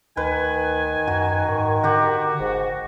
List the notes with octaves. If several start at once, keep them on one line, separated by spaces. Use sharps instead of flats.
D2 D#3 B4 G#5
F#2 F#4
G#2
D3 F#4 G4 F#5
F#1 G#2